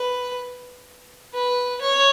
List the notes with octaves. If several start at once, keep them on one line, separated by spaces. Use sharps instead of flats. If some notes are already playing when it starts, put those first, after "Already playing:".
Already playing: B4
B4
C#5